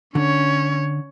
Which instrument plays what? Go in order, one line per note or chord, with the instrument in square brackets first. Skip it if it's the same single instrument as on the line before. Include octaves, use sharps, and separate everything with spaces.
[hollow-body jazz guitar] D3 [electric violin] C#4 C#5